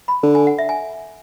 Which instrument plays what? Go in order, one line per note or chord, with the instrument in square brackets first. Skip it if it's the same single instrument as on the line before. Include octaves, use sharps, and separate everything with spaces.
[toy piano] B5
[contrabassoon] D3
[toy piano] G#5
F#5
E5
G#5